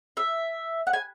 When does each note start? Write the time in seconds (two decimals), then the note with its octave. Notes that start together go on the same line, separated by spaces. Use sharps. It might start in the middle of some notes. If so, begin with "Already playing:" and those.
0.17 E5
0.87 F#5
0.93 G#5